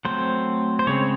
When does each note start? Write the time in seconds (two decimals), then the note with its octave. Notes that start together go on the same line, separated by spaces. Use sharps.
0.05 F#3 A3 C4 C5
0.79 C5
0.87 C#3 G#3 C4 C#5